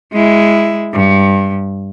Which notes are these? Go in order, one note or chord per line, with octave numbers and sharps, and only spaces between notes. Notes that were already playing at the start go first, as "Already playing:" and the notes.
G#3 E4
G2